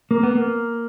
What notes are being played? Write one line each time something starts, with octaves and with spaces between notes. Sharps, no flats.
A#3
B3
A#3